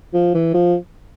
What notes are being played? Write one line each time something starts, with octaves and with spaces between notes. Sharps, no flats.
F3
E3
F3